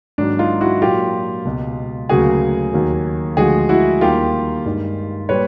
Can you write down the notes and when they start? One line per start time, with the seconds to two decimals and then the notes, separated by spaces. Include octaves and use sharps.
0.18 G#2 D#3 F#3 A#3 D4
0.39 D#4 F4
0.60 E4 F#4
0.81 A#2 F#3 A#3 F4 G4
1.45 C#2 B2 G#3
2.09 D2 C#3 F#3 A#3 F#4 G#4
2.73 D#2 D#3 F#3 A#3
3.37 D2 D3 F3 G#3 F#4 G#4
3.69 E4 F#4
4.01 D#2 D#3 G3 A#3 F4 G4
4.65 G2 D#3 G#3
5.29 A#2 G3 B4 C#5